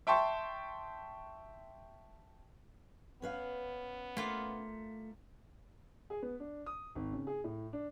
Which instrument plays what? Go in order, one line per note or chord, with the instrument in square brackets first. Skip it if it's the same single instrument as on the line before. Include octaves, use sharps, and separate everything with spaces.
[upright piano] E5 G5 A5 C6 C#6
[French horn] B3 [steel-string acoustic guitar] C#4 B4 F5
[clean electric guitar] A3 [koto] A#3 F4
[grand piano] G#4
B3
D4
D#6
G#1
C#3
G#4
A2
D4